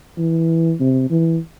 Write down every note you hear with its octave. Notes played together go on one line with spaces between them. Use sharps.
E3
C3
E3